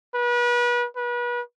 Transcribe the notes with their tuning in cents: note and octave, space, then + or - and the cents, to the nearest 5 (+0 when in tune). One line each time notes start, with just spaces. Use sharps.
B4 -35
B4 -35